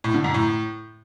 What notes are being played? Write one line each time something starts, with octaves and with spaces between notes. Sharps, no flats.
A2
D3
F#2
A2